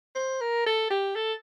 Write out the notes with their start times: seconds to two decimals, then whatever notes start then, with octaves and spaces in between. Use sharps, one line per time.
0.15 C5
0.41 A#4
0.66 A4
0.90 G4
1.15 A4